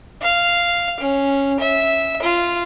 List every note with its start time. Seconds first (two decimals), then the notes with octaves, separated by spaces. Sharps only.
0.22 F5
1.00 C#4
1.60 E5
2.22 F4